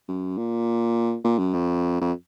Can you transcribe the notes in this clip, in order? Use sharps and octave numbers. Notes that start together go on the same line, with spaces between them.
F#2
A#2
A#2
F#2
F2
F2